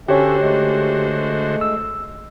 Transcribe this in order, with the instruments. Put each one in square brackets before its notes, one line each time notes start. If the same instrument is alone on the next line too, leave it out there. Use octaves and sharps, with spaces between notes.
[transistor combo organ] D3 F#4 C5 [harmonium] C#4 A4 E5 [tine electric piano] G4 C#5
[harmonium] G#3 A3
[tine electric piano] E6